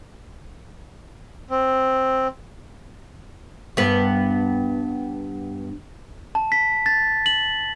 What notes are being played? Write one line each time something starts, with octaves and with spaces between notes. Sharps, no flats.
C4
G2 B3
A5
B6
A6
F#7